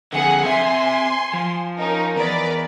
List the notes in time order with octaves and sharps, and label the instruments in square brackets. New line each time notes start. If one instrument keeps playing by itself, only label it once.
[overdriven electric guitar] F2 D3 [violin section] G#4 F#5
[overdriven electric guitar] C4 E5 [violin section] G#5 C6
[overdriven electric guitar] F3
[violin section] C#4 D#4 A#4
[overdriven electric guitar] E2 [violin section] A#4 B4 D5